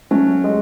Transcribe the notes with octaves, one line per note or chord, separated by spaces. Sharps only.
F#3 A3 C#4
G#3